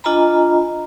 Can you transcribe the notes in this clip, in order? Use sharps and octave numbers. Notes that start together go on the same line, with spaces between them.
D4 F4 D#5 G#5 A#5 B5